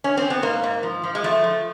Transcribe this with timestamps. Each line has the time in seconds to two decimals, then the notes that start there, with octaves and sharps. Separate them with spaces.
0.04 C#4
0.17 C4
0.30 B3
0.42 G#2 A#3
0.64 G#2
0.83 F3
1.03 F3
1.15 G#3
1.24 F3 A3
1.44 F3